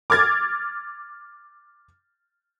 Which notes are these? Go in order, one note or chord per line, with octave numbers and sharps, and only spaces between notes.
D6 F6 G#6 A6